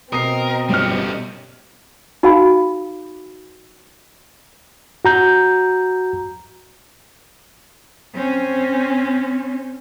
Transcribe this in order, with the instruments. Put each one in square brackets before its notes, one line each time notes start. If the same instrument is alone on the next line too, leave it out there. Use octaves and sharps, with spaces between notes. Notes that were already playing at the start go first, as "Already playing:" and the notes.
[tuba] B2 [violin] C4 D#5 [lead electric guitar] A#4 [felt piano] D#6 C7
[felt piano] G1 F6 [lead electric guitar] G3 C#4
[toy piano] D#4 F#4 G#4 F5 G5 B5
[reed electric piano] F#4 A#5 G6
[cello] C4 C#4